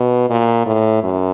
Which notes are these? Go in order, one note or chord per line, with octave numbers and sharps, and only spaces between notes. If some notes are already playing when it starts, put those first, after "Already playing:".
Already playing: B2
A#2
A2
F#2